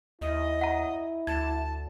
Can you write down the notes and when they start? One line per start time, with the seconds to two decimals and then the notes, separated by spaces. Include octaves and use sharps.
0.21 D#2 E4 D#5
0.61 F#5 A#5
1.27 D2 A5 G#6